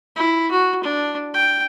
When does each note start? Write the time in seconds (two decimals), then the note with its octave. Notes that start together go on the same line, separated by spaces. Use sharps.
0.16 E4
0.51 F#4
0.83 D4
1.34 G5